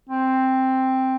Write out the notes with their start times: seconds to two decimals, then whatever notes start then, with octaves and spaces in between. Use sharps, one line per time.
0.09 C4